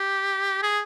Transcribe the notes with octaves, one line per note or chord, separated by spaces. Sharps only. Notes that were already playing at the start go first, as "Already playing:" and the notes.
Already playing: G4
G#4